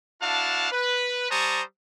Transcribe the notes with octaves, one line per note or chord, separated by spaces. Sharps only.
D4 E4 F#4 F5 A5
B4
G3 C5 A5 A#5 C#6 D#6